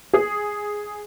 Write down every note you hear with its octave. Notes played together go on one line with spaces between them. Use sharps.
G#4